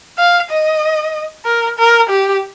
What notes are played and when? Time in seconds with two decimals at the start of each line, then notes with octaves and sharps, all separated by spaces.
0.18 F5
0.50 D#5
1.45 A#4
1.78 A#4
2.10 G4